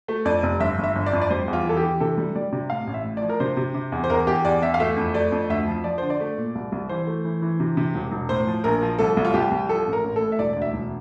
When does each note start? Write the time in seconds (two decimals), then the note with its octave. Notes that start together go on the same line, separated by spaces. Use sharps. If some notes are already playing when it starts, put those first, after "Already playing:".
0.08 A3
0.25 F2 D5
0.43 F1
0.60 G1 E5
0.79 G1
0.84 E5
0.96 G1
1.06 D5
1.13 F2
1.22 D5
1.30 G3 C5
1.48 E2
1.53 F4
1.65 E3 A4
1.77 G4
1.83 E3
2.00 C3 A4
2.18 G3
2.36 G3 D5
2.52 C3
2.70 A2 F5
2.87 A1
2.94 E5
3.04 A2
3.17 F3 D5
3.29 A#4
3.40 C3 C5
3.57 C3
3.75 C3
3.92 E2
4.04 C5
4.10 E2 A#4
4.27 E2 G4
4.45 E2 D5
4.62 E2 E5
4.74 F5
4.80 A3 E5
4.97 F2
5.14 A3 D5
5.32 F2
5.50 D2 E5
5.68 F3
5.84 F3 D5
5.98 D3 C5
6.10 D5
6.20 A3
6.37 A#2
6.55 C2
6.72 C2
6.89 E3 C5
7.07 A3
7.25 E3
7.42 E3
7.60 C3
7.77 C3
7.95 E1
8.12 E1
8.29 A2 C5
8.47 F3
8.64 A#1 A#4
8.82 F3
8.99 C2 A4
9.17 C2
9.25 F4
9.34 C2 G4
9.51 C2
9.69 F3 A4
9.87 A1
9.93 A#4
10.04 A1
10.16 A2 A4
10.32 E5
10.39 E1 D5
10.53 D2 D5
10.62 E5
10.74 E1